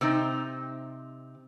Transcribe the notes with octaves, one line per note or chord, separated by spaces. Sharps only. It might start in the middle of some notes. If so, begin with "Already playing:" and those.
C3 C4 D#4